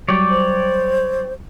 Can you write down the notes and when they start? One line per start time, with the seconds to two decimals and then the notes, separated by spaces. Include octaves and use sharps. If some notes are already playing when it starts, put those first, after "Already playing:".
0.09 F#3 G3 C#5 D5 G5
0.30 C5